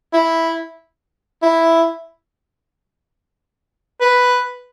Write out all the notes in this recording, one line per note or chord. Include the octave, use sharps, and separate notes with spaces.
E4
E4
B4